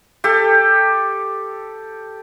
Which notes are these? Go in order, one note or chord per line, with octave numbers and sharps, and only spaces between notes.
G4 A4